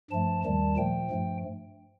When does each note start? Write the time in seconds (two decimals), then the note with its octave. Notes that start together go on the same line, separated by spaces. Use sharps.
0.11 G2 F3 A3 A5
0.44 D#2 D#3 G3 A5
0.77 A#2 F3 A3 G5
1.11 G2 F3 A3